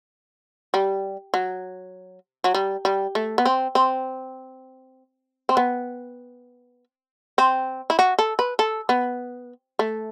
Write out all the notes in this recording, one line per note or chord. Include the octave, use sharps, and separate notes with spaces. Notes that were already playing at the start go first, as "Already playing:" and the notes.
G3
F#3
F#3
G3
G3
A3
B3
C4
C4
C4
B3
C4
E4
F#4
A4
B4
A4
B3
A3